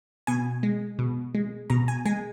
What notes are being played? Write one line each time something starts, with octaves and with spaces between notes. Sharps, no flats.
B2 G#5
G#3
B2
G#3
B2 A#5
G#5
G#3 G#5